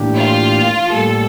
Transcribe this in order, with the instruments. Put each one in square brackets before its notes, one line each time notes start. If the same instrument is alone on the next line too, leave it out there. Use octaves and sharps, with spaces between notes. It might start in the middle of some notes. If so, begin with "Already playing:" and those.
Already playing: [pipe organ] A2 E3 A#3 D4 G4
[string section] F4
[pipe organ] A2 G3 A#3 [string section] A4